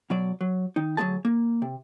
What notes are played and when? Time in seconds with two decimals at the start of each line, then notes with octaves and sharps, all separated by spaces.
0.10 B2 F#3 D5
0.41 F#3
0.76 D#3 D#4
0.97 D2 F#3 G#3 C4 G#4 A5
1.25 A#3
1.62 C3